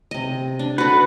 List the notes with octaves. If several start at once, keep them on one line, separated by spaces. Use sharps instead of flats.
C3 D#5
D4
F#4 A4 B4